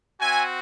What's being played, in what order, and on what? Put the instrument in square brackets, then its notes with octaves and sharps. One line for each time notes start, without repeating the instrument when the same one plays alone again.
[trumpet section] C4 F#4 E5 G#5